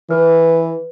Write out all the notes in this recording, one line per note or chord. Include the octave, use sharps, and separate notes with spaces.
E3 B4